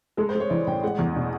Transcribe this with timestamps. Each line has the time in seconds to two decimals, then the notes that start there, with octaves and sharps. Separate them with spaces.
0.17 G#3 A4
0.29 C5
0.35 G#3
0.40 C#5
0.50 E3 D5
0.67 A1 G5
0.84 G#3 F#5
0.99 E2
1.16 B2